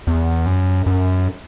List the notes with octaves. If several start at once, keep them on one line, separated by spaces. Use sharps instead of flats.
E2
F#2
F#2